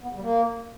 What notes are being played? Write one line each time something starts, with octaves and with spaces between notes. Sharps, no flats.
B3
C#3
G3
A#3